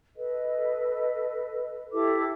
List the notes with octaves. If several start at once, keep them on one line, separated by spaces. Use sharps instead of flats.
A4 B4 D#5
E4 G4 A4 D6